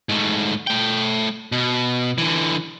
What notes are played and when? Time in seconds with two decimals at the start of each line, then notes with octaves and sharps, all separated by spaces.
0.09 G#2 A3
0.67 A3 G5
1.52 B2
2.18 D3 E3